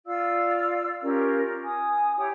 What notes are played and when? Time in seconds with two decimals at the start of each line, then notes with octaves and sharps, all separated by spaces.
0.06 F4 D5 F5 E6
1.02 C#4 F4 G4 A#4
1.63 G#5 D#6
2.16 E4 G4 C#5 G5